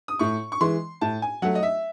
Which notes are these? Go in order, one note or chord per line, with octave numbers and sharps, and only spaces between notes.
D#6
A2 C#6
C#6
E3 G#3 C6
A2 A5
G#5
F#3 A3 F#5
D#5
E5